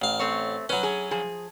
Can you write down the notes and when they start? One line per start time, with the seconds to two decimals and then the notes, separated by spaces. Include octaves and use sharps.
0.02 A1 F5
0.19 A3 C4 C#5
0.69 F#3 C#4 B4
0.83 G#4
1.11 F3 G#4